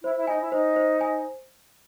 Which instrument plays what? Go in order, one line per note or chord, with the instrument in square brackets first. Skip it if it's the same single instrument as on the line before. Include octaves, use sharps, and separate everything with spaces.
[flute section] E4 [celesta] C5
[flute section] E4
[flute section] D#4 [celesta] G#5
[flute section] E4
[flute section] D#4 [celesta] C5
[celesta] C5
G#5